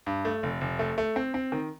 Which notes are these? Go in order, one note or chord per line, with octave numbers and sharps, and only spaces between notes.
G2
A3
F1
F1
A3
A3
C4
C4
D#3